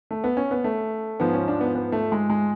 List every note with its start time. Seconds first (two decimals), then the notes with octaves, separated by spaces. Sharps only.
0.11 A3
0.24 B3
0.37 C#4
0.51 B3
0.64 A3
1.20 G#2 F3 B3
1.33 C#4
1.48 D4
1.61 B3
1.75 B3
1.92 A3
2.12 G#3
2.30 G#3